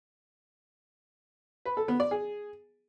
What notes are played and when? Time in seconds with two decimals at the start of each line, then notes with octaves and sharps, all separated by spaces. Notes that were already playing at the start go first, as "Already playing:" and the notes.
1.65 B4
1.77 A4
1.88 B3
2.00 D5
2.11 G#4